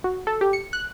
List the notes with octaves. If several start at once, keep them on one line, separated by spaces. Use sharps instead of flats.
F#4
A4
G4
C#7
F#6